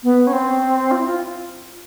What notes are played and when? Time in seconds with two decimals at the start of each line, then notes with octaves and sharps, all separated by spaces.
0.03 B3
0.27 C#4
0.33 C4
0.91 F4
0.99 E4
1.06 F4